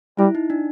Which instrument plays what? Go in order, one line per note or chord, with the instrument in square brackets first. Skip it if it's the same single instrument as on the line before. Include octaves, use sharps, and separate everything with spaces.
[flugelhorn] G3 [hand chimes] E4
[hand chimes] D#4
D4